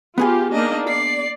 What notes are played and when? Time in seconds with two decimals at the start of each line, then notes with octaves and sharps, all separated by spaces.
0.18 B3 F4 G4 G#4 G#5
0.53 A#3 D4 D#4 D#5
0.88 D5 C7